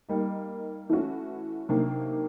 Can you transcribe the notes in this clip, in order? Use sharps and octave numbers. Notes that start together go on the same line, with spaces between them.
G3 A#3 D#4
E3 A3 C#4 F#4
C3 D#3 F#3 A#3 D4